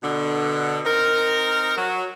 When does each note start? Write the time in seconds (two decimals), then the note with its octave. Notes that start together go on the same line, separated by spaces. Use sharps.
0.03 B2 D3
0.85 C4 D#4 A#4
1.77 F#3